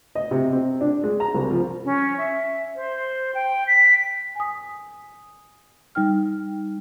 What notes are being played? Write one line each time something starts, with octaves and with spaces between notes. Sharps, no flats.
D#5
C3
C4
D4
G#3
A#5
C2
F3
C#4
E5
C5
G5
B6
G#5 D#6
G3 D#4 G5 F6